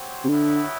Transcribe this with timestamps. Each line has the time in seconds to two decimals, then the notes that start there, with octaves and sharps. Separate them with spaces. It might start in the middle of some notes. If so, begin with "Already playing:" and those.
Already playing: F#3 C4 G4 C5
0.24 C3
0.28 A2 D3 F#3 B3 E4